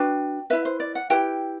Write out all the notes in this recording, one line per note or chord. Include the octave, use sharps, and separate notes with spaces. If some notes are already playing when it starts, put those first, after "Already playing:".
Already playing: D4 F#4 B4 G5
E4 B4 E5
C5
D5
F#5
E4 G4 B4 G5